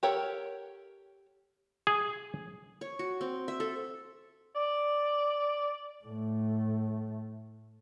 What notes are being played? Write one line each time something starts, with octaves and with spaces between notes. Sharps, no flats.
G4 A4 A#4 C#5 F#5
G#4
C#5
F#4
C4
E5
A4
D5
A2 A3